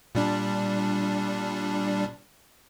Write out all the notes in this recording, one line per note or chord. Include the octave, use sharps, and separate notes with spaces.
A#2 G3 D4